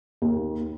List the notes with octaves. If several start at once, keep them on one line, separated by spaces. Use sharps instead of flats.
D#2